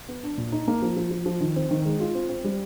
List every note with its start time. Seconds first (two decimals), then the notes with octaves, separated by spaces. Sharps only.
0.09 B3
0.23 D4
0.37 A#2
0.52 D#4
0.68 A#3
0.82 F3
0.97 F3
1.11 F3
1.26 F3
1.41 D#3
1.56 C4
1.71 D#3
1.85 G#3
2.00 F4
2.15 C4
2.29 C4
2.44 G3